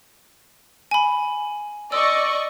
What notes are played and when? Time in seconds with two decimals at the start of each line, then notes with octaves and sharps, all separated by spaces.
0.91 G#5 B5
1.92 D5 D#5 C#6 E6